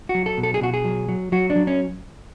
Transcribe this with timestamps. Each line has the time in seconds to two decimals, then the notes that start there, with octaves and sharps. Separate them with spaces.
0.09 F#4
0.15 F#3
0.26 A4
0.37 B2
0.43 A4
0.54 G#4
0.61 B2 F#4
0.74 G#4
0.85 F#3
1.09 F#3
1.32 F#3 F#4
1.50 D4
1.56 F#3
1.67 C#4